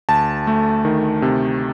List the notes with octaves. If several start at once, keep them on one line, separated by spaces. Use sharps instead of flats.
D2 A5
A3
D#3
C3